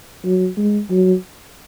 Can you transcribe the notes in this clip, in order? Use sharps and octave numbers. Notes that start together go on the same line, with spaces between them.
F#3
G#3
F#3